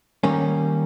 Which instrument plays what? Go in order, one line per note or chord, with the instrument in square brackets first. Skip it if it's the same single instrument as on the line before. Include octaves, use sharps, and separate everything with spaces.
[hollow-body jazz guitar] D#3 G3 A#3 C#4